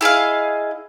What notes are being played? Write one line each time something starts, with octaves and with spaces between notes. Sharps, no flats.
E4 G#4 D#5 F5